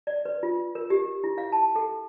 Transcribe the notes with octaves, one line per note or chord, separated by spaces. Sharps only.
D5
B4
F4
A#4
G4
E4
F5
A5
A4